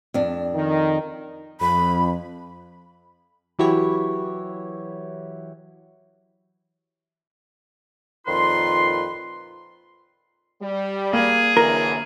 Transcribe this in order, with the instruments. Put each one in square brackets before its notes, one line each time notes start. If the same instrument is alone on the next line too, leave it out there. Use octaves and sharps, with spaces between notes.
[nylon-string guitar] F2 D4
[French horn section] D#3
[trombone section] F2 [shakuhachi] B5
[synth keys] E3 F#3 E4 F#4 G4 C#5
[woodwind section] F2 A#2 D#3 F4 B4 C6
[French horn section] G3
[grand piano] A#3 [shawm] G#4
[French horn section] F#2 D3 E3 [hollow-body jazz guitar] A#4